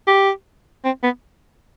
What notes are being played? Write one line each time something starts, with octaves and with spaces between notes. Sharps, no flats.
G4
C4
B3